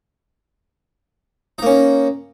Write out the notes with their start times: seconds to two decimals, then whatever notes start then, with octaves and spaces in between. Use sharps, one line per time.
1.58 D#4
1.62 A#3
1.66 C#4